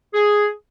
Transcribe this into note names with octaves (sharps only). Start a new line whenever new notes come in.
G#4